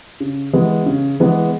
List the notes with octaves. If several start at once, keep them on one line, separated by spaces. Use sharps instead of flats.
C#3
E3 G#3 B3
C#3
E3 G#3 B3